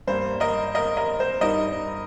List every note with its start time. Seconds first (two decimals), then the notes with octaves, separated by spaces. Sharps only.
0.07 G2 G3 A#3 C5
0.40 A#4 D#5
0.75 A#4 D#5
0.97 A#4 D#5
1.20 C5
1.41 G2 G3 D#4 A#4 D#5